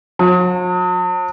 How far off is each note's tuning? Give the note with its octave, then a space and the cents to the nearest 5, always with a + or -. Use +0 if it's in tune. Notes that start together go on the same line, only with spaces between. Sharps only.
F#3 -45